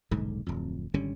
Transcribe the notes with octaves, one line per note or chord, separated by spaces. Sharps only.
D#1 B1 G#2 D3
D1 F2
G#1 D3 G3 C#4